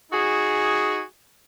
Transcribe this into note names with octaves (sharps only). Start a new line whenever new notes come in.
D#4 F#4 G#4